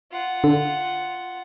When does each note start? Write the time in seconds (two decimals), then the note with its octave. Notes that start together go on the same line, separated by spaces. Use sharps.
0.12 F4 F#5
0.44 D3